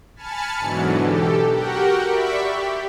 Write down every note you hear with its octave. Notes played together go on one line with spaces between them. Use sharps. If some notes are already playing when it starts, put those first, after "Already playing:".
G#5 A5 B5 F6 A6 C#7
G#2 B2 D3 E3 F#3
G4 A4
F#4 G4 A#4 F#5 G5
D5 E5 B5 C#6 B6
G4